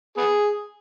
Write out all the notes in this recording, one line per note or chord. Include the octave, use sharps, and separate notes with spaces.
B3 G#4